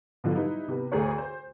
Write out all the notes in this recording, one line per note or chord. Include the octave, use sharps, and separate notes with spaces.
B2 D3 F3 F#3
G3 D#4 E4 B4
C3 B3
D2 D3 A3 G#4 A#4 C#5
C5